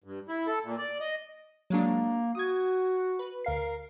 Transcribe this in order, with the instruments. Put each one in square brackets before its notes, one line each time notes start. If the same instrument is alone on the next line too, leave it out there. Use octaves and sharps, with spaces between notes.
[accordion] G2
E4
A4
A#2
D5
D#5
[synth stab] F#3 G#3 D4 [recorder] A#3
[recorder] F#4 [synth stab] D#6 G#6
[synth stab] B4
[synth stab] D2 F5 C7 [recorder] A#4